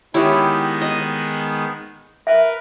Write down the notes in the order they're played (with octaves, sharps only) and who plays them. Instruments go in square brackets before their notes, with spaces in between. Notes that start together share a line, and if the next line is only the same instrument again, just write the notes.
[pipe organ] D#3 G#3 B3 [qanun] E4 G4 C#5
[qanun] D#5
[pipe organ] A#4 B4 [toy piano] E5